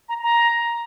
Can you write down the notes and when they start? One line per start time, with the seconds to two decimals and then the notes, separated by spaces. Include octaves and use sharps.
0.09 A#5
0.23 A#5